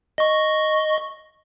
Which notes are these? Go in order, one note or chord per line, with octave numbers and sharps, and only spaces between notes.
D#5 C#6